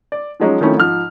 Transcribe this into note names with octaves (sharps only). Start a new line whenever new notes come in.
D5
F3 F#3 G#3 C#4 D#4
D#3 F3 A3 C4 C#4 E4
G#2 F3 F6